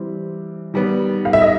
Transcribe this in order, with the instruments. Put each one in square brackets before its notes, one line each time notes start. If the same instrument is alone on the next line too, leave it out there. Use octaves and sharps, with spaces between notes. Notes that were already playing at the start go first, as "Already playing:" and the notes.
Already playing: [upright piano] E3 G3 C4
D#3 G3 B3
[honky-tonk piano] F5
E5
D#5